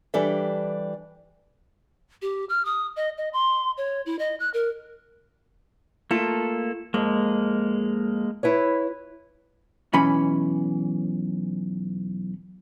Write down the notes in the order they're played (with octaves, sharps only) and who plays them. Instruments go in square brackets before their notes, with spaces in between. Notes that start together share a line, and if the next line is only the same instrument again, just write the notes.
[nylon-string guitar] E3 G3 D4 G4 A4 E5
[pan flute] G4
F6
D#6
D#5
D#5
C6
C#5
E4
D#5
F#6
A#4
[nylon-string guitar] A3 F4 [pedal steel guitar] A#3 A4
[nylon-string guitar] F2 [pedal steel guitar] G#3 A#3
[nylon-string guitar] E4 B4 C#5
[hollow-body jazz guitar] B1 E3 C#4 B5